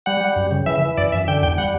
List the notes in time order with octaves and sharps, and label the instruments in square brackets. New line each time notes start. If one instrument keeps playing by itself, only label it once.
[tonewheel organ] G3 F#5
G3
F#2
C#3
E3 E5
E3
F#2 D5
F#2 E5
D3 G5
E2 G5
G3 F#5